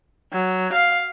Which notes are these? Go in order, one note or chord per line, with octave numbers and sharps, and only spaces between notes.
F#3
F5